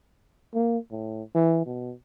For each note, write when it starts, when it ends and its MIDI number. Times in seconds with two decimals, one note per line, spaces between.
0.55 0.78 58
0.91 1.23 45
1.35 1.63 52
1.66 1.93 47